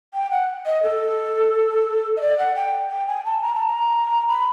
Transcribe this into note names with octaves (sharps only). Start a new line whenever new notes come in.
G5
F#5
D#5
A4
D#5
D5
F#5
G5
G5
G#5
A5
A#5
A5
A#5
B5